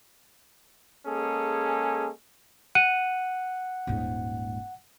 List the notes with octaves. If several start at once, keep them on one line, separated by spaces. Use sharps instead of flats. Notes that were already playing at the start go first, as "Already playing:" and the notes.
G#3 A#3 C#4 G#4 A4
F#5 D#7
D#1 G#2